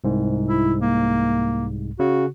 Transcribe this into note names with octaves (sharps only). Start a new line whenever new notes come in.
C2 G#2
E4
A#3
C#3 F#4